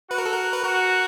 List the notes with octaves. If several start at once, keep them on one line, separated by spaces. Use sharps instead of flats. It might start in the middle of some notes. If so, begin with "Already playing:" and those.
F#4 B4
A#4
A4
A#4
B4
F#4 A#4